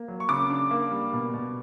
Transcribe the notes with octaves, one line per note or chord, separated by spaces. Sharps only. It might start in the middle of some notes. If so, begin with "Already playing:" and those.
Already playing: A#3
F#3
C#6
C#3 D6
D4
A#3
G3
B2
B2